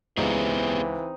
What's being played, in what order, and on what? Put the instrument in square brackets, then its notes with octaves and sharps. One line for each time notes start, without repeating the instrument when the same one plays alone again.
[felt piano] C#2 [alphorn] E3 [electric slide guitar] B3 G4 G#4 [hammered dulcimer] C4 D#4